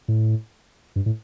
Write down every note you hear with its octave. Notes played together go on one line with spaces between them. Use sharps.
A2
G2
A2